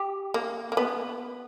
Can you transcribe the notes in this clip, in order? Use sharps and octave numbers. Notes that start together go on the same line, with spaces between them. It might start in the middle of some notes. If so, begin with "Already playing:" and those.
Already playing: G4
A#3
A#3
B3